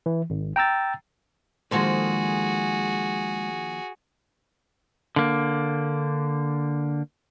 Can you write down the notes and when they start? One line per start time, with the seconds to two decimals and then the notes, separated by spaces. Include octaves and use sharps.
0.06 E3
0.30 G#1
0.56 G5 A#5 E6 A6
1.71 D#3 F3 G#3 A#3 F#4 G#4 A4 C5
5.16 D3 A#3